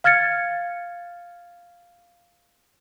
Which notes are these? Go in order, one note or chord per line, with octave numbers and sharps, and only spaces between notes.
F5 F6 G#6 A6 C#7